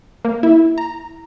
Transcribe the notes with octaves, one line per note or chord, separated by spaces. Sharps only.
A#3
E4
A#5